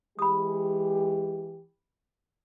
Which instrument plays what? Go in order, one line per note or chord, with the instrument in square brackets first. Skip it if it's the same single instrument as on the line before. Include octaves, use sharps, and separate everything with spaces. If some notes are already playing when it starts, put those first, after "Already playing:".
[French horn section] E3 G#3 G4 [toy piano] B5 D#6